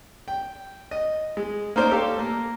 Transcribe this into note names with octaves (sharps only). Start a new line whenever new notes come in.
G5
D#5
G#3
A#3 C#4 D#4 A#4 C5 D5
G4 A4 F5
A#3